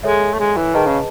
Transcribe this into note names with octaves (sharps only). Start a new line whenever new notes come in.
G#3 A4 C#5 E5
A3
G#3
E3
D#3 G#4 B4 D#5 A5
C#3